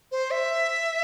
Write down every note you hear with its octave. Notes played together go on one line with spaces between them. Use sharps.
C5
E5